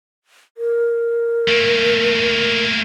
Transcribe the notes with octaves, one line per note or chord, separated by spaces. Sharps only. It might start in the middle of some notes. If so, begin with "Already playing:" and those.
A#4
A3 A#3